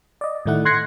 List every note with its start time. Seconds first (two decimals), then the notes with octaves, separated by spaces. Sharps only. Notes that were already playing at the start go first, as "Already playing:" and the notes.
0.21 D5 D#5
0.46 A2 D#3 A3 E4 F#5
0.65 C6 F#6 G#6 A#6 C7 C#7